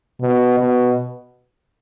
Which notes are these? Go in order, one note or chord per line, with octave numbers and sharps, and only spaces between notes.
B2
B2